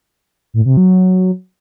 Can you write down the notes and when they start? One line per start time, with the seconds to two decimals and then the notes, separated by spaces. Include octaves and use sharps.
0.54 A2
0.65 C3
0.77 F#3